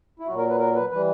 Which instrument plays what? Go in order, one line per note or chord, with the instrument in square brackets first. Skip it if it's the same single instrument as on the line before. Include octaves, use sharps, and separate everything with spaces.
[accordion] E4
A#2 F#3 F#4
A#4
B4
A#4
B4
E3 G3 B4